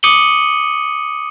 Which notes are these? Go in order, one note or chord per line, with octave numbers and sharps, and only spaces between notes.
D6 D#6 C#7 D#7 F#7 G7